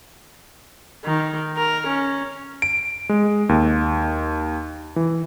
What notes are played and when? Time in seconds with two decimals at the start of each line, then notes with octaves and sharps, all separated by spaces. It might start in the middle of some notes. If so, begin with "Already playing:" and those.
1.05 D#3
1.56 A#4
1.86 C#4
2.62 D7
3.09 G#3
3.49 D#2
4.96 E3